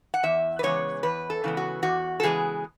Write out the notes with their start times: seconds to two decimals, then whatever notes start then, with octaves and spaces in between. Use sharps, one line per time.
0.14 F#5
0.23 E2 E5
0.59 B4
0.63 C#3 E3 G#3 B3 C#5
1.03 E2 B4
1.30 A4
1.44 C#3 E3 G#3 B3
1.57 F#4
1.83 E2 F#4
2.20 A4
2.23 C#3 E3 G#3 B3 G#4